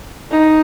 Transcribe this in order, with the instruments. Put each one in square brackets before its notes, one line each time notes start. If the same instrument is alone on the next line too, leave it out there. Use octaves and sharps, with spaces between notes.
[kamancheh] D#4